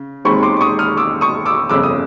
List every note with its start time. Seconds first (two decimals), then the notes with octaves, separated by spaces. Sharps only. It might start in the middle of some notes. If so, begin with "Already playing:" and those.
Already playing: C#3
0.25 E1 D#2 D#3 G#3 C4 B5 C#6
0.43 C6 D6
0.57 D6
0.61 C#6 D#6
0.79 D#6 F6
0.97 D6 E6
1.21 C#6 D#6
1.46 D6 E6
1.69 G1 F2 C#3 D6 E6
1.83 D#6